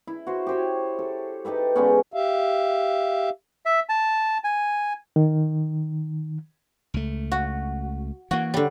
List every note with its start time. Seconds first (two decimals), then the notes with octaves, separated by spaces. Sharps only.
0.07 E4
0.27 F#4 C5
0.47 G4 C5 C#5
0.99 A4
1.45 D#4 G4 A4 B4
1.76 D3 G#3 B3 C#4
2.13 G4 E5 F5
3.65 E5
3.89 A5
4.44 G#5
5.16 D#3
6.94 C#2 A3
7.32 F#4
8.31 E3 A#3 F#4
8.54 D3 G3